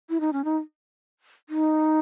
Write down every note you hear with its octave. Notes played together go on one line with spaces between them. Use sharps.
E4
D#4
C#4
D#4
D#4